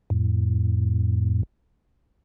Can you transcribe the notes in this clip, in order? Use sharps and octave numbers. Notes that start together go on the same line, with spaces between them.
F2 A2